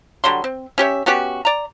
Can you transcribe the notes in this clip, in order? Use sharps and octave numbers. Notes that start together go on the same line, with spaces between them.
D3 F#3 G3 C6
C4
C#4 G4 C#5 E5
B3 C#4 F#4 G4
D5 A#5